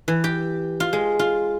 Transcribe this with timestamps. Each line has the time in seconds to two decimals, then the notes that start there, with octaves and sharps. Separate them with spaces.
0.08 E3
0.24 G4
0.80 F4
0.93 G#3
1.19 F4